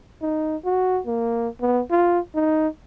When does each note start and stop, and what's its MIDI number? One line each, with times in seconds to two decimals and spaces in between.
0.22 0.57 63
0.65 1.01 66
1.07 1.49 58
1.61 1.82 59
1.91 2.19 65
2.35 2.68 63